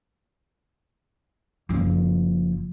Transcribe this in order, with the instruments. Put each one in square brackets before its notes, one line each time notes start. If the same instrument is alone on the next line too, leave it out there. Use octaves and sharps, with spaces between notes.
[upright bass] F#1 F3